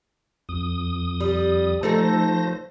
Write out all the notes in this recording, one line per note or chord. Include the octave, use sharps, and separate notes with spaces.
F2 D#6
G3
F3 A3 D#4 A4 C5 A#6